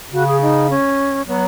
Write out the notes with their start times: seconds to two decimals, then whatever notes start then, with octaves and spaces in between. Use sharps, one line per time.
0.12 C#3 F#4
0.27 G#4
0.42 D#4
0.70 C#4
1.28 F#3 B3